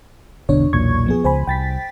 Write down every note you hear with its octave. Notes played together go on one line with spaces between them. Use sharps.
G#1 E2 B2 D3 D4 C#5
B1 E2 A#2 C#6 G#6
F3 B3 G#4
C#2 C5 G#5 B5
C2 G5 A6 B6